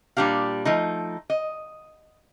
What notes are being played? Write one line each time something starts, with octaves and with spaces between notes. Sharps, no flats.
A#2 G3 D4 G4 F5
F3 A3 D#4
D#5